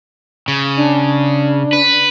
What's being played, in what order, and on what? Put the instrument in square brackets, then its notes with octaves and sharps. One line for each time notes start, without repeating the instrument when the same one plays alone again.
[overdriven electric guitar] C#3
[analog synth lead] D4
[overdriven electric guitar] B4